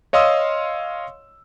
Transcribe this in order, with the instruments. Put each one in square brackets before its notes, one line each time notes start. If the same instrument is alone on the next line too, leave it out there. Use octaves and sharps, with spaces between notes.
[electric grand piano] C#5 D#5 F5 C6 D#6 E6